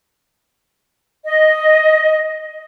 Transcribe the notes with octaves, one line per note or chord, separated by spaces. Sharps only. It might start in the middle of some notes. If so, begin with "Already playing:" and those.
D#5